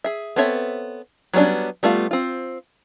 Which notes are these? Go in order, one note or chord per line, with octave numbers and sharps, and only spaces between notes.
G#4 E5
B3 C4 A4 C#5 E5
F#3 G3 B3 C#4 D4
G3 A3 B3 F4
C4 F4